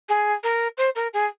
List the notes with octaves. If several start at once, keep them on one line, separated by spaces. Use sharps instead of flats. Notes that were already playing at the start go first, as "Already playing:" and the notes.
G#4
A#4
C5
A#4
G#4